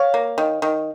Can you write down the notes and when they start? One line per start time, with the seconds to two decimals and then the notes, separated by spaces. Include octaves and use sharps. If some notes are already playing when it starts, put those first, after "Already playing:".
Already playing: C#5 F5
0.14 A#3
0.38 D#3
0.62 D#3